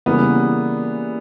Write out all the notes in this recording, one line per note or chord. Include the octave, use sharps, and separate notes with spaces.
C#3 E3 G3 A#3 B3